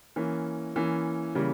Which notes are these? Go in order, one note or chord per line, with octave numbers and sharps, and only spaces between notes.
E3 A#3 C#4
E3 A#3 C#4
C#3 E3 G3 A#3